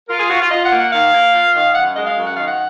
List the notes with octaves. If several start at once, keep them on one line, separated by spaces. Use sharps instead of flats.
F4 A#4
G#4
F4 F#4
F4
F4 D#5
F#5
A#3
F#5
D#3 F5
A#3
F4
D#3
F#2 F#5
G#3 D#5
F5
F#2
F#5
D#3 F5
F#5